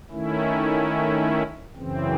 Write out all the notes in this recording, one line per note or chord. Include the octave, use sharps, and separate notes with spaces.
D#3 A3 C#4 E4
F#2 C#3 E3 C4